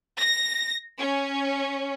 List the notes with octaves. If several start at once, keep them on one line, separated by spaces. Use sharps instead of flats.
A#6
C#4